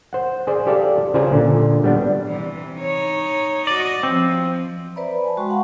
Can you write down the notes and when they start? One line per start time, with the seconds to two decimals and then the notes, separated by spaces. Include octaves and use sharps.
0.13 C5 F#5
0.47 G#4 C5 D5
0.67 G4 A4 D5 F5
1.14 C#3 F4 C5 D5 G#5 A#5
1.31 A#2 D3
1.84 G3 B3 D4
2.25 C3 E3
2.77 D#4 C#5
3.67 F#4 D5 D#5
4.03 F3 C4
4.96 B4 C5 D5 E5 A#5 B5
5.24 G#5 A5
5.37 G#3 F#4 G5 A5 C6 C#6
5.49 F5 F#5 A5 B5